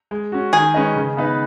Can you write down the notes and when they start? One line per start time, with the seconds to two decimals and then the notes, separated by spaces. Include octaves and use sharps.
0.11 G#3
0.32 C#4 F#4
0.53 D#3 G#4
0.74 G#3 C#4 B4 D#5
0.96 C#3
1.17 B3 D#4 B4